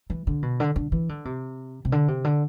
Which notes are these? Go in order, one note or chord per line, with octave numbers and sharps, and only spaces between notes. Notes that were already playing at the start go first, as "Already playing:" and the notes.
E3
D3
B2
D3
D3
E3
D3
C3
C3
D3
C3
D3